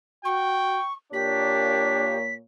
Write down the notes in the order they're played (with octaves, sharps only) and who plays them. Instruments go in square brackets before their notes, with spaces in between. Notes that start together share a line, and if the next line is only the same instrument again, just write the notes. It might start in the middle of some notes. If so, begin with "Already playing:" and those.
[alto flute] F#4 [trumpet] G5 [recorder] C#6
[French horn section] A#2 A#3 C#5 [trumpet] D4 [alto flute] G4 [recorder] B6